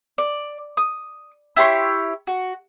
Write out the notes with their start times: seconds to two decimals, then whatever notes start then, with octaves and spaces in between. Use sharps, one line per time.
0.18 D5
0.77 D#6
1.56 E4 G4 C#5 C6
2.27 F#4